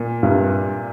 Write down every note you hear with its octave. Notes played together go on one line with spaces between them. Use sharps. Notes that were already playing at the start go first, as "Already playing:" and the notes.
Already playing: A#2
G2 C3